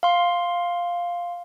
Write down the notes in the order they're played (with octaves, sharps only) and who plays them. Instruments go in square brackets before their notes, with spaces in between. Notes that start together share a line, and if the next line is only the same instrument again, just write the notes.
[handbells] F5 C6